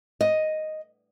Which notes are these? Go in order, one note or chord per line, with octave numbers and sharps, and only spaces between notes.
D#5